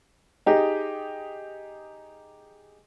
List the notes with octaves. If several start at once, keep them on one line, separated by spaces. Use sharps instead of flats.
D#4 G4 G#4 D#5